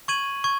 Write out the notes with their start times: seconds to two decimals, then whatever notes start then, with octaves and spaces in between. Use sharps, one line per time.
0.08 C#6 G#6 D#7 F#7
0.44 C#6 G#6